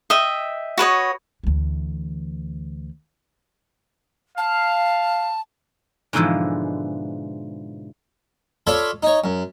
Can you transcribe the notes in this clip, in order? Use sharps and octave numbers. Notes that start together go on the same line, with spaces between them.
D#5 E5 G5
F#4 B4 C#5 D#5
D2 E3
F5 A5
G#2 B2 D3 E3 F3 G#3
F4 A4 C#5 D5 B5
D#4 C#5
F#2